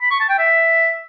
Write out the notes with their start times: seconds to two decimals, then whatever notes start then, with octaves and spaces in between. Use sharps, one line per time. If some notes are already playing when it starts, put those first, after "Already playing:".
0.02 B5
0.11 C#6
0.20 A5
0.29 G5
0.39 E5